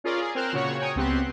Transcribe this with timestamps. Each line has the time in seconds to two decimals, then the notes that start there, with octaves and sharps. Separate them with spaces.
0.04 C#4 F4 G#4 A#4 D5
0.22 G#4
0.35 C4 A#4 C5 F6 F#6 E7
0.53 A#2 C#3 F#4 C#5 F#5 C#6
0.80 C#5 G5 G#5 A#5 C#6 D#6
0.96 C#2 B3 C4 G4 C6 F#6